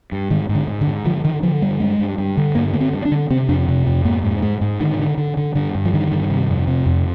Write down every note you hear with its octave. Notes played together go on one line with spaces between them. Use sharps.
G2
G#2 D#3
G#2
D3
G#2
D3
G#2
D3 F3
D3 D#3
D3 F3
G2 G3
G2 G#3
G2
G2
D3
G2 A#3
D3 A#3
C4
G2
D4
D3
C3 C4
F2 D4
C3
F2
G#2 A#3
G#2
G#2 G#3
G#2
D3 D#3
D3
D3
D3
G2 D3
G2
F3
D3 D#3
G2
C3
F2
C3
F2